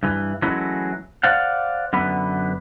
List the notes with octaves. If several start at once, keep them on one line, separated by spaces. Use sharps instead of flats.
G2 E3
E3 F#3 G#3 A3 C#4 E4
C5 D5 F5 F#5
F#2 D3 B3 B4